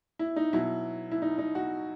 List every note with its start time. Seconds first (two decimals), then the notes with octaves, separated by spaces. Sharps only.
0.19 E4
0.36 D#4
0.53 B2 F#3 E4
1.11 E4
1.22 D#4
1.38 D#4
1.55 F#4